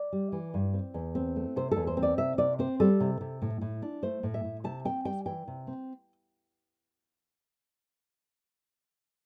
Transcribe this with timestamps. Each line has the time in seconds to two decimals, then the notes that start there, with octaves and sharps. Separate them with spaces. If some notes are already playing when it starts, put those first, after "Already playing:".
Already playing: D5
0.12 G3
0.32 E3
0.54 G2
0.74 C4
0.94 E2
1.15 C4
1.36 A3
1.56 C3 C5
1.71 E2 A4
1.87 C5
1.97 C4
2.03 D5
2.18 C3 E5
2.38 C3 D5
2.59 C4 C5
2.80 G3 A4
3.00 C3
3.21 C3
3.42 A2
3.61 A2
3.82 D4
4.03 A3 C5
4.23 A2
4.34 E5
4.44 A2
4.64 C3 A5
4.85 C4 G5
5.05 G3 G5
5.26 E3 G5
5.48 C3
5.67 C4